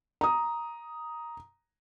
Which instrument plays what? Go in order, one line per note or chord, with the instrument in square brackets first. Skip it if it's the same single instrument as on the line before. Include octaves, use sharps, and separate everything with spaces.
[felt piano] A#5 D#6